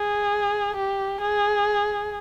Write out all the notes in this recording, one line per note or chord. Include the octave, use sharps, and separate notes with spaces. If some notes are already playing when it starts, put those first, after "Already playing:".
Already playing: G#4
G4
G#4